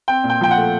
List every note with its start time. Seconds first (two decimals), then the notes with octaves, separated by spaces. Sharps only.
0.08 C4 G5
0.24 A#2
0.30 G5
0.41 F3 G5
0.51 F#5
0.56 A3